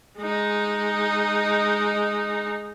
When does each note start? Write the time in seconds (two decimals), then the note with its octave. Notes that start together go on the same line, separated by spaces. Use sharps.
0.18 G#3 D#4